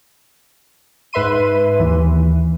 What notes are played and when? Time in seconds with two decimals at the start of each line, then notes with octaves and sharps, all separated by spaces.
1.13 G#2 B4 E5 C6 D#7
1.79 D#2 E3